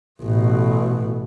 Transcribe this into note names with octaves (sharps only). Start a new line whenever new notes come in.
A1 B2